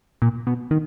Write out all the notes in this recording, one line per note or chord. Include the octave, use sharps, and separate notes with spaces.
A#2
B2
D#3